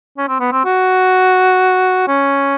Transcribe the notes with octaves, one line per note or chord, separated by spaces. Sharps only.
C#4
C4
B3
C4
F#4
C#4